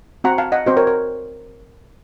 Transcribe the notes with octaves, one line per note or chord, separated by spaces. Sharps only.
C4 F#4 F#5 A#5
F5 A5
D#5 F#5
C4 F#4 C5 D#5
A#4 C#5
A#4